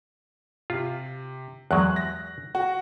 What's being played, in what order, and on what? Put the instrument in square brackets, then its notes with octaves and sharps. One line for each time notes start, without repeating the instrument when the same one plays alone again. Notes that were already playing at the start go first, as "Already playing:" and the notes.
[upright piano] C3 [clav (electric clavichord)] F4
[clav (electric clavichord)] E2 F#3 G#3 [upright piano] F#6
[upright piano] A#6
F#4